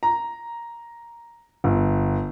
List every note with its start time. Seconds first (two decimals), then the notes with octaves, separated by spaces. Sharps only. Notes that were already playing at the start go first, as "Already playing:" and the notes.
0.03 A#5
1.64 G1